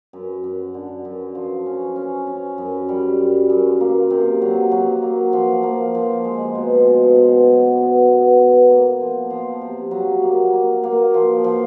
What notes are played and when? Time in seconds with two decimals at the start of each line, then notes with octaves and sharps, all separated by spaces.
0.13 F#2
0.44 F#2
0.74 D3
1.05 F#2
1.35 F3
1.66 C#4
1.96 C#4
2.27 C#4
2.58 F#2
2.89 G3
3.19 F#2
3.50 F#2
3.80 A#3
4.10 C3
4.42 F#3
4.72 F#3
5.02 A#3
5.33 F3
5.63 A#3
5.95 F3
6.25 G#3
6.55 B2
6.86 B2
7.16 B2
7.48 F#3
7.77 B3
8.08 B3
8.39 B3
8.69 A#3
9.00 F3
9.30 F3
9.61 C3
9.91 F#3
10.22 A#3
10.53 A#3
10.83 A#3
11.14 F3
11.44 F3